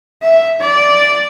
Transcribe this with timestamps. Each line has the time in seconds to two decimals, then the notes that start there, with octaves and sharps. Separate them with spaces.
0.23 E5
0.61 D5